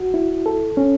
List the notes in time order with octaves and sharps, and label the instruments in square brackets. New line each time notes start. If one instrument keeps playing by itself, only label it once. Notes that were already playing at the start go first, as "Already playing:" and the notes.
Already playing: [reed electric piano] F#4
E4
A4
C#4